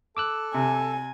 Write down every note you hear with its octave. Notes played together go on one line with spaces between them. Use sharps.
A4 D6 E6 F#6
C3 G#5